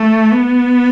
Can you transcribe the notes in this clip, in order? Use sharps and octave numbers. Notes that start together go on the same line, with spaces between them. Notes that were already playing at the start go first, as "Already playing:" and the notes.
Already playing: A3
B3